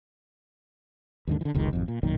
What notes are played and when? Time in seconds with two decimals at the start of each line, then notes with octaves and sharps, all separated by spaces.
1.27 D#2 G#2 D3
1.41 D3 E3
1.55 F1 C#2 D#3
1.73 G#1 F2
1.88 A#2
2.03 B1 F#2 A#2 D#3